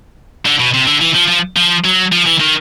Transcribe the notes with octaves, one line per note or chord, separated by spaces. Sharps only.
D3
B2
C3
D3
E3
F3
F3
F3
F#3
F3
E3
D#3